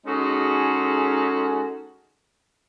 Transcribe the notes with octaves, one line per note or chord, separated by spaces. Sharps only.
G#3 C#4 D#4 F#4 G#4 A4